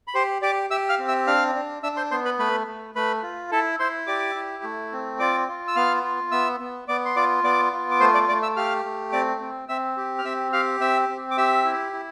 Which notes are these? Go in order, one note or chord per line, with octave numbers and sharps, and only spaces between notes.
B5
G4 C5 C6
G4 D5 D6
G4 E5 E6
F5 F6
C4
E5 E6
D4 F5 F6
D4
D4 E5 E6
C5 C6
B3 C5 C6
B4 B5
A3 B4 B5
A3
A3 B4 B5
F4
E4 A4 A5
E4 C5 C6
G4 D5 D6
E4
A3
C4
F4 D5 D6
F4
E6
B3 F5 F6
F4
B3 E5 E6
B3
B3 D5 D6
C6
F4 D5 D6
B3 D5 D6
F4
D6
A3 C5 C6
D5 D6
A3 D5 D6
E5 E6
G4 F5 F6
A3
C4 D5 D6
C4
C4 E5 E6
G4
F6
C4 E5 E6
G4 F5 F6
C4 E5 E6
C4
D6
G4 E5 E6
E4
E4